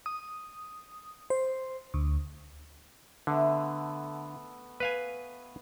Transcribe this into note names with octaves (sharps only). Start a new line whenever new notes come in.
D#6
C5
D2
D3 A3 B3 E5
B4 F5 G#5